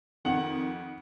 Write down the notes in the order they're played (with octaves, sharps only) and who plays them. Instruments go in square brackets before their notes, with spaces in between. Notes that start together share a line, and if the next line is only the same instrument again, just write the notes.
[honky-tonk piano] F2 [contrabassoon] D#3 [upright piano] F#5 F#7